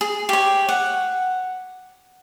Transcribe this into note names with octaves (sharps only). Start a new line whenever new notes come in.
G#4
G4 C#5
F#5